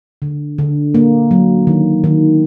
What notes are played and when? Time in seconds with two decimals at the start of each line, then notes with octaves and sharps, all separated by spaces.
0.22 D3
0.58 D3
0.95 A#3
1.31 F#3
1.67 D#3
2.04 D#3